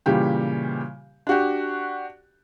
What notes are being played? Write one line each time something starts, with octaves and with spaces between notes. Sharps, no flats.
A#2 C#3 E3 G3 G4
D4 F#4 G4